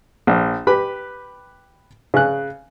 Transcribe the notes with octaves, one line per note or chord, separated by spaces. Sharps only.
A#1
G4 B4 B5
C#3 F#6